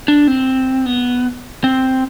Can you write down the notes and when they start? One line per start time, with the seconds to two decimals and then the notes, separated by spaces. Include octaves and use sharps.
0.08 D4
0.28 C4
0.86 B3
1.64 C4